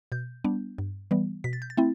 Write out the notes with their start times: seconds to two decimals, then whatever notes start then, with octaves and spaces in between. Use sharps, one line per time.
0.12 B2 G6
0.44 G3 B3 D4
0.78 G2
1.11 E3 G3 B3
1.44 B2 B6
1.53 A6
1.62 G6
1.70 A6
1.77 A3 C4 E4